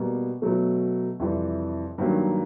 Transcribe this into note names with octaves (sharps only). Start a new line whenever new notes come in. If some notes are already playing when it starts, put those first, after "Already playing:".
Already playing: B2 G3 A#3
B2 F#3 A3
F2 C3 E3 G3
G2 D#3 F#3 A#3